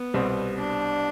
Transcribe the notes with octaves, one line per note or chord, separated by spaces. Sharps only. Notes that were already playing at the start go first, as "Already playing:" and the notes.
Already playing: B3
C2 B2 G3 C4
D4